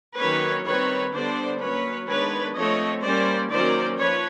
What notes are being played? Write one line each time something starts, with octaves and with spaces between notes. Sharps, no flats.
D#3 F#3 A#3 C#4 B4 C#5
D#3 G3 C4 B4 C#5
D3 G3 B3 D4 C5 D5
F#3 A#3 C#4 B4 C#5
D#3 G#3 B3 D4 B4 C#5
F3 A3 C4 C#5 D#5
G3 A#3 C#4 C5 D5
D#3 F#3 A#3 C#4 C5 D5
F3 B4 C#5